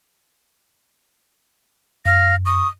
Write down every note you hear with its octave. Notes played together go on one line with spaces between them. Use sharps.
F#2 F5 A#6
C#6 D#6